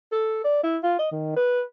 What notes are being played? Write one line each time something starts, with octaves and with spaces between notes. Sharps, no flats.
A4
D5
E4
F4
D#5
D#3
B4